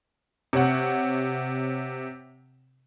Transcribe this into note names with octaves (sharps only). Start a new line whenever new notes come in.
C3 C#5 F#5